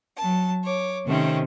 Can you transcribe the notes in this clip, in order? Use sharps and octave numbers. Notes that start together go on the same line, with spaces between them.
F#3 A5
C#5 D6
C3 D#3 A3 C4 C#4